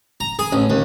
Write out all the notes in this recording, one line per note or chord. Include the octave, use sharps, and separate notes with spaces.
A#5
G#4
A1
D#2